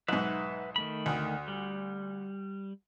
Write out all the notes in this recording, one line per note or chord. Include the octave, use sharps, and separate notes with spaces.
B1 G#2 B4 E5 F#5
D#3 A3 B5
D2
G3